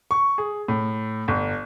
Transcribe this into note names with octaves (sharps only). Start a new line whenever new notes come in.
C#6
G#4
A2
G1